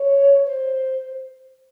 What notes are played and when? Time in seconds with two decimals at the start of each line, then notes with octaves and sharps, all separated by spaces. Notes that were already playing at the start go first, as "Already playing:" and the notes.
Already playing: C#5
0.45 C5